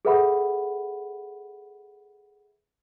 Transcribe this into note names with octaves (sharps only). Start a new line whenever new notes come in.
G#4 A4 B4 E5 F#5 B5